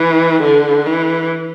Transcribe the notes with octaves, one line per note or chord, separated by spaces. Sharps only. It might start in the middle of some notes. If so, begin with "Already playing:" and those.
Already playing: E3
D3
E3